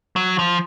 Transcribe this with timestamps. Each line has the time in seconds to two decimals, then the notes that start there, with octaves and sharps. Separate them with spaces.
0.16 F#3
0.39 F3